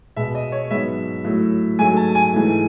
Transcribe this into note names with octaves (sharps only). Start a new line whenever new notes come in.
B2 G#3 B3 E5
D#5
C#5
G#2 F#3 B3 E5
A2 F#3 A3
G#2 F#3 A3 G#5
A5
G#5
G#2 E3 A3